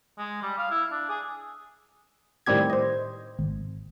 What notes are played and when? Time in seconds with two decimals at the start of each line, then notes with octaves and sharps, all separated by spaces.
0.18 G#3
0.43 G3
0.58 F5
0.71 E4
0.91 D4
1.09 G#4
2.46 A2 D#3 G3 C4 G4 G#6
2.70 C5 D#5
3.39 G#1